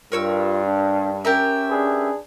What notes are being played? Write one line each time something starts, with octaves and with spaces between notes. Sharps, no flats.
G2 F4 A#4 C#5 E6
D4
C#4 G4 A#4 E5
D4 G#4 B4